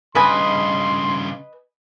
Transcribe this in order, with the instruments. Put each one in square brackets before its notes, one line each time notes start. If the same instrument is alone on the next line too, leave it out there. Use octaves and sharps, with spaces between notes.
[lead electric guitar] G2 C#3 [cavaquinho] B4 D#5 G#5 [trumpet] C6